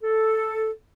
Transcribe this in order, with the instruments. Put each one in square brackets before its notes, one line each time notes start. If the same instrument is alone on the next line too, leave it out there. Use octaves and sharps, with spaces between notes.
[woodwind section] A4